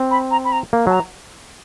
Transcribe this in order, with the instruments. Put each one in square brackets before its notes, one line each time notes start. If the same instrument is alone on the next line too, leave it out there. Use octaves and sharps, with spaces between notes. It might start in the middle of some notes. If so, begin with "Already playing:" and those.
Already playing: [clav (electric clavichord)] C4
[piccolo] B5
A#5
B5
A#5
[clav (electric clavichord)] A#3
[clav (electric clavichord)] F#3 [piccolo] A5
[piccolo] A#5